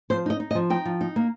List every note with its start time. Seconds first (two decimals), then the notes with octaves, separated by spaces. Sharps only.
0.10 F3 C5
0.26 D#4 D#5
0.40 D#4
0.51 D#5
0.55 F3
0.70 D#4 G5
0.85 F3
1.01 D#4
1.16 A#3